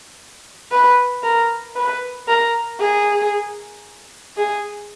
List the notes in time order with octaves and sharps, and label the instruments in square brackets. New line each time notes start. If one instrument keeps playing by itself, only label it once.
[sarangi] B4
A#4
B4
A#4
G#4
G#4